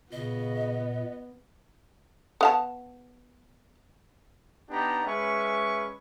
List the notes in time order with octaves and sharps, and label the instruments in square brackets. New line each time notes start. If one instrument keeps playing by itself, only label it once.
[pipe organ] A#2 [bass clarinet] C#3 [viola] B3 [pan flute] D#5
[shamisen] B3 F5 A5
[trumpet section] B3 D4 D#4 G4 A#5
G#3 C#4 B4 E5 C#6